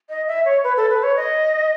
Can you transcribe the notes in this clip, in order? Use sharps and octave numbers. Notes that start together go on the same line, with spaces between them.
D#5
E5
C#5
B4
A4
B4
C#5
D#5